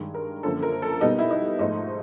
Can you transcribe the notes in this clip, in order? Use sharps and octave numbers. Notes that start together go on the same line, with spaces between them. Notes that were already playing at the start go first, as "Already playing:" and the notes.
Already playing: G2 D#3 G#3
A#4
F#2 D3 F3 A#3 A4
A#4
A4
B2 G3 B3 D#4
E4
D#4
G#2 F3 A3 D#4